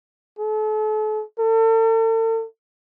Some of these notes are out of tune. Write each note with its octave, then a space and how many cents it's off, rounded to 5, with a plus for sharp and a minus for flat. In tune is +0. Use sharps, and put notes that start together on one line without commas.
A4 -40
A4 +40